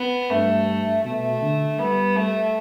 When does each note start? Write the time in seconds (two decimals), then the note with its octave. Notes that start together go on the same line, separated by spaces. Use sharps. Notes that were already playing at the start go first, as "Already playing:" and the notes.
Already playing: B3
0.30 G2 A3
1.05 B2 A3
1.42 D3
1.78 G3 B3
2.16 A3